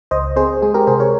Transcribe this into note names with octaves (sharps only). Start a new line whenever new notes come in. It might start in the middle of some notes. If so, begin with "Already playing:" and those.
C#2 C5 D#5
C4 G#4 C5
G#3 G#4
G4 A#4
C3 G#4 C5
A#4 C#5